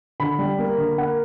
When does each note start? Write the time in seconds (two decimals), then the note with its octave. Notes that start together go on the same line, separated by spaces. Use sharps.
0.20 D3 B5
0.39 G3
0.59 A#3
0.77 D3
0.98 A#3 F#5